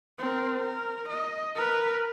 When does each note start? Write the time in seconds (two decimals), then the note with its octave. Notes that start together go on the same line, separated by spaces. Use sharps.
0.19 C4 A#4
0.58 A#4
1.08 D#5
1.55 A#4 B4